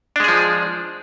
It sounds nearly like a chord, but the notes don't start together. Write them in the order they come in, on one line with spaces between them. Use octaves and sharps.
D4 G#3 G#4 F3